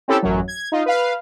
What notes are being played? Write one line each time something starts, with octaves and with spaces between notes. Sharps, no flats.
C4 C#4 E4 G4 A4
A1 F#2 F#3
G#6
D#4 F4
B4 F5